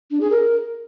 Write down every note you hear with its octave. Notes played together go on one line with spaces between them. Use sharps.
D4
G#4
A#4